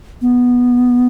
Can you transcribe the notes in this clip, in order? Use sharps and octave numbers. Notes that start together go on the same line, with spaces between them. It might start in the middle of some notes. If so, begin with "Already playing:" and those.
B3